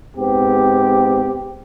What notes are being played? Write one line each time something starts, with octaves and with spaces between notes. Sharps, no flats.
G#2 B3 C4 G4